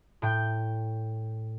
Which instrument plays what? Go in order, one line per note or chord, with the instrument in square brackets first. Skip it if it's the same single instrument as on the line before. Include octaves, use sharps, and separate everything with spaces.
[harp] A2 G5 G6